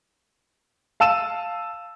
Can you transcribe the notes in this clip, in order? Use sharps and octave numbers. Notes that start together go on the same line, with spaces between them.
F5 A5 E6 D#7 E7